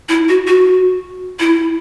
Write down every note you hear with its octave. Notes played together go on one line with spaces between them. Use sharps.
E4
F#4
F#4
E4